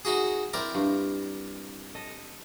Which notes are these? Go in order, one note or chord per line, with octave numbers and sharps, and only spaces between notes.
D#4 F#4 G#4
C4 E4 A#4 D5
G2
A4 D#5